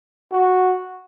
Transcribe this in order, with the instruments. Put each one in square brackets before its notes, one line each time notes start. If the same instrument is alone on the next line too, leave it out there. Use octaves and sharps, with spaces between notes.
[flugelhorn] F#4